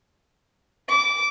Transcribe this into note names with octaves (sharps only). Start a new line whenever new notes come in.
D6